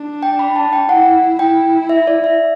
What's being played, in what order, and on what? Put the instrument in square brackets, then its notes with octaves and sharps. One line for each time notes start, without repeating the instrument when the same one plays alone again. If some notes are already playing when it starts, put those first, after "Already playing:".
Already playing: [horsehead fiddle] D4
[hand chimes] G5
B5
A5
G5
[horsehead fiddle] E4 [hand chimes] F#5
[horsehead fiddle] E4 [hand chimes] G5
[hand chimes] E5
D5
E5